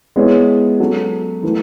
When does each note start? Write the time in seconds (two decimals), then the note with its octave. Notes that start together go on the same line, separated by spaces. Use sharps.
0.16 G#3 B3 E4 G#4 C#5
0.80 F#3 C#4 F#4 A4
1.43 E3 A3 E4